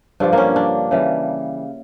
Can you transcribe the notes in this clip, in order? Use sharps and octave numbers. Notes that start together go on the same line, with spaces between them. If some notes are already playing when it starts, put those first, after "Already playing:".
G2 D3 F3 D4
A#3 C#4
D4
C#3 E3 G3